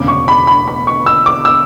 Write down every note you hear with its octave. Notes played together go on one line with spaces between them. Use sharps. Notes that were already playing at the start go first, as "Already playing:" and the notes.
Already playing: E1 D2 C#3 D6
C#6
B5
B5
B5
C#6
E6
D6
E6